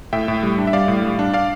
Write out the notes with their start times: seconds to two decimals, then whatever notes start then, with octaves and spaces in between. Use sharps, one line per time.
0.13 A2 E5 G5
0.28 A2
0.43 G3
0.58 D4
0.67 E5
0.73 G3 D5 F5
0.88 A2
1.04 G3
1.19 D4
1.33 D4 D5 F5